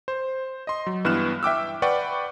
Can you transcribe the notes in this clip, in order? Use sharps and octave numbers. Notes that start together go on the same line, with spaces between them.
C5
D#5 C6
F#3
G2 E3 B3 F6 F#6 E7
E5 G5 D6 E6
B4 D5 F#5 G5 B5 C#6